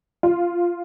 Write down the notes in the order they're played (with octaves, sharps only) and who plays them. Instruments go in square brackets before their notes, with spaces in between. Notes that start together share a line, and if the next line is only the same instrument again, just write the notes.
[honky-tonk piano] F4